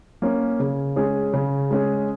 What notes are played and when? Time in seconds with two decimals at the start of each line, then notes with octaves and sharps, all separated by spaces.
0.22 A#3 C#4
0.60 C#3
0.96 G#3 C#4 G#4
1.33 C#3
1.71 G#3 C#4 G#4